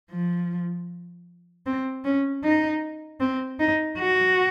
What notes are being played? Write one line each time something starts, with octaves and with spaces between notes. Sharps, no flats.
F3
C4
C#4
D#4
C4
D#4
F#4